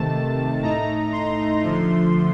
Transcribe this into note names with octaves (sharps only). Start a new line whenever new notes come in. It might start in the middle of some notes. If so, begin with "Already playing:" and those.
Already playing: C3 D#3 A3 A5
A2 A3 D#4 A#5
C6
D3 F3 A3